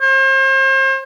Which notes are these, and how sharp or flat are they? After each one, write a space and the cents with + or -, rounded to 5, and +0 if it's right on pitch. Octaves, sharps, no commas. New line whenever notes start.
C5 +40